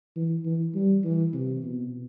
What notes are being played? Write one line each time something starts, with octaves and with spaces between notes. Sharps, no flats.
E3
E3
G3
E3
C3
B2